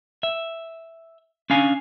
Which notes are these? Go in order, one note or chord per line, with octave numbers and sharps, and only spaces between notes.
E5
C#4 D4 F5 G#5